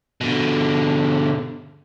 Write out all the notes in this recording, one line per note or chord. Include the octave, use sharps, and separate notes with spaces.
B2 D3